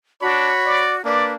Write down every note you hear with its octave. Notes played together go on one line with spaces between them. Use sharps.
D4 F#4 C#5 B5
D5
A#3 D4 B4 D5